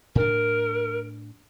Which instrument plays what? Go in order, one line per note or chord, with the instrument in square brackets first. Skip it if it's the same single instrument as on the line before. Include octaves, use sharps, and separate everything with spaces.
[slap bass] A2 D4 [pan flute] A#4